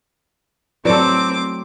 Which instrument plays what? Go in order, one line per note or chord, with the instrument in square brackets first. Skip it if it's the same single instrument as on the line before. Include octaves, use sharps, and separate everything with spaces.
[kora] F#3 A3 [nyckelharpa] C4 [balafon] E4 B4 D5 [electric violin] D6